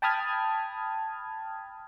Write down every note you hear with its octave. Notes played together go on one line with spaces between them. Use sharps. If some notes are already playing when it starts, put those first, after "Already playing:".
G5 A5 B5 D#6 F6 G#6